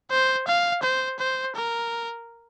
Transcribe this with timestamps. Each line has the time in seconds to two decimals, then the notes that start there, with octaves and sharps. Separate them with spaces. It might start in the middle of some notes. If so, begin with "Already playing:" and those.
0.11 C5
0.47 F5
0.83 C5
1.19 C5
1.56 A#4